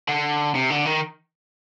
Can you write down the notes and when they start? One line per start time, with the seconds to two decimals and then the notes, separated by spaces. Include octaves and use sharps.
0.08 D3
0.55 C3
0.70 D3
0.86 D#3